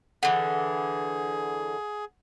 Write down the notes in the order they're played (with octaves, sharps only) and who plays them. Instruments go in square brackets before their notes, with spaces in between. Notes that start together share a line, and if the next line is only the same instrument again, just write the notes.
[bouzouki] D3 E3 [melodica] G#4 [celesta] F#5